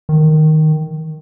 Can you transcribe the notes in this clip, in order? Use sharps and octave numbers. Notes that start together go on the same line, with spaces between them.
D#3